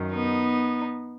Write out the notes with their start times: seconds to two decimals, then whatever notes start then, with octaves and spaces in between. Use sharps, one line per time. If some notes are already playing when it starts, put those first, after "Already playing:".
Already playing: F#2 D#3
0.11 B3 D#4